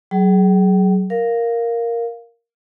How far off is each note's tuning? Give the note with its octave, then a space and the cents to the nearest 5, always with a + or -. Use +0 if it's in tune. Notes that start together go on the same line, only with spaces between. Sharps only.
F#3 +25 G#4 +15 G5 -35
A#4 +0 F5 +0